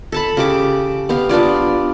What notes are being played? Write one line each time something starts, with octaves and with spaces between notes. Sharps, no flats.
A4 A5 B5
C#3 G4 D6
B3 G4 F5
B3 D4 F4 D5